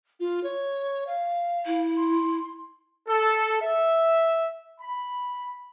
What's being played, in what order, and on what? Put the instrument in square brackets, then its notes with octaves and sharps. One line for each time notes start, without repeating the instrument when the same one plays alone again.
[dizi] F4
C#5
F5
[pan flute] E4
[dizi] C6
[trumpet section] A4
E5
B5